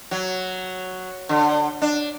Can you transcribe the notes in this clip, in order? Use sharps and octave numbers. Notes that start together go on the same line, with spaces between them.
F#3
D3
D4